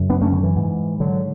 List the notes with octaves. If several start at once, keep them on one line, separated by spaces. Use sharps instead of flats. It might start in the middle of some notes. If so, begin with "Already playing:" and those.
Already playing: F#2 C#3
B3 D4
A3 C#4
D3
E3
G#2
D3 F#3